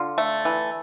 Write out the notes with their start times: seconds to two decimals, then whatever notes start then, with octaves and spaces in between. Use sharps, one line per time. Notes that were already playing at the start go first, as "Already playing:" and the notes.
Already playing: D3 F4
0.18 A3
0.45 E3